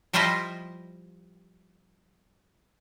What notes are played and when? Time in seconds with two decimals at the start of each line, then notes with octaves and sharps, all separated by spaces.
0.13 F3 G3 E4 F4 C5 D#5